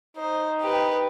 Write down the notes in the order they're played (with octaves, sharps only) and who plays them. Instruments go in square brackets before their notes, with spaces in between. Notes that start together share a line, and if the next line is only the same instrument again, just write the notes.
[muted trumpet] D#4 [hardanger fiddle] C5
[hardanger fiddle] G4 B4